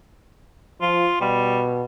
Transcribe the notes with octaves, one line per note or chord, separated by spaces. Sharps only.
F3 F4
B2 G3